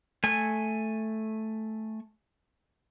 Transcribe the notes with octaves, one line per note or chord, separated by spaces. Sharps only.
A3 G#5